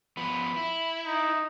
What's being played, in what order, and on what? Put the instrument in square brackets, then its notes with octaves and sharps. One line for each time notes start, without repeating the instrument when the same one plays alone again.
[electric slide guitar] F3 B3 [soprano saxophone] B5
[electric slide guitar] E4
[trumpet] D#4